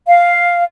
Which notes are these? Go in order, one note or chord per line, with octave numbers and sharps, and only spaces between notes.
F5